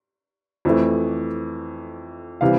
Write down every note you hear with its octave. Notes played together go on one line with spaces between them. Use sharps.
F2 E3 A3
C3 E3 G3 F5